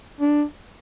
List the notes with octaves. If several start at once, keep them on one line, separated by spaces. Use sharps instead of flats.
D4